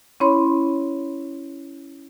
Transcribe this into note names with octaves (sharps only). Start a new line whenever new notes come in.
C#4 E4 C#5 B5 C6